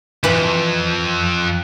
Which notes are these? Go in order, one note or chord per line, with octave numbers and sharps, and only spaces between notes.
F2 E3 B4